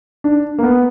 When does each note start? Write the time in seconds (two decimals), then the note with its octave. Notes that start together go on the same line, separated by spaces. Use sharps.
0.24 D4
0.59 A#3
0.63 B3